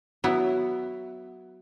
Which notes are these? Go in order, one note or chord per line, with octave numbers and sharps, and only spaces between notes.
F#3 B3 E4